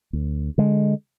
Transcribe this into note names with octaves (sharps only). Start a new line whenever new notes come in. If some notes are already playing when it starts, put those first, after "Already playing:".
D2
D3 G#3